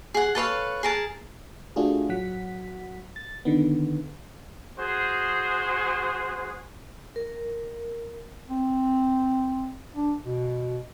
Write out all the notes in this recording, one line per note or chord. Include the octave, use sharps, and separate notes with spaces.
G#4 F#5
A4 B4 C#5 F5
G#4 A#4 A5
A3 D4 F4 F#4 G#4
A1 F#3 F#5 B6
A6
D3 D#3 B3
F#4 G#4 C5
A#4
C4
D4
B2